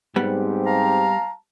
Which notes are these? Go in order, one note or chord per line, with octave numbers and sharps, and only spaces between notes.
G#2 G3 B3 C4 G4
F5 A5 A#5